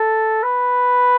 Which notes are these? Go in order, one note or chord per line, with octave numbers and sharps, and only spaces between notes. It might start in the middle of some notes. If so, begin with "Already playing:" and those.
Already playing: A4
B4